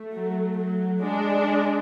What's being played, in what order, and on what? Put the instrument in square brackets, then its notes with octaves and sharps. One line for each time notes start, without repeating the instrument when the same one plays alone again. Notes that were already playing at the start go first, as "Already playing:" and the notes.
Already playing: [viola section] A3
[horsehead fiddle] F#3
F#3
[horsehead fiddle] G#3 [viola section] D4